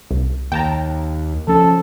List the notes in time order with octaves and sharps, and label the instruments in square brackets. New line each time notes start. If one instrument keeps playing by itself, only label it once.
[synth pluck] C2
[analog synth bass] D#2 [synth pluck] G5 A5 A#5
[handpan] F3 C#4 [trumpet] A4